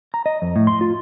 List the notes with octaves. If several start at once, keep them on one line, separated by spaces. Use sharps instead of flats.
A#5
D#5
F2
A2
C6
F4